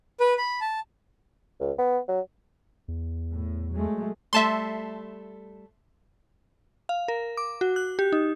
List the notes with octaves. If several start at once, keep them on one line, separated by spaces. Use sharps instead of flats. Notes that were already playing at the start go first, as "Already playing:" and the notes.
B4
B5
A5
C#2
B3
F#3
E2
A2
F#3 G#3 A3
G3 A3 E5 A5 C6
F5
A#4
D6
F#4
F#6
G4
D#4